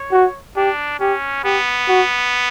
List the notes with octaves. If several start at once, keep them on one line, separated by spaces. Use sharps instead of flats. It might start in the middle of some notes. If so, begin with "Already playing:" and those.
Already playing: C#5
F#4
D4 G4
C#4 G4
B3 G4
F#4